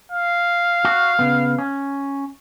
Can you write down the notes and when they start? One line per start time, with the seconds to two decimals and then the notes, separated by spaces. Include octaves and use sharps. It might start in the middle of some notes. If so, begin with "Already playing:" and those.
0.12 F5
0.85 F#4
1.19 C#3 B3
1.58 C#4